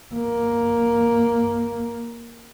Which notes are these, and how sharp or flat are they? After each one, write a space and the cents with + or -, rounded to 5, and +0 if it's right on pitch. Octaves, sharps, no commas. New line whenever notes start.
A#3 +5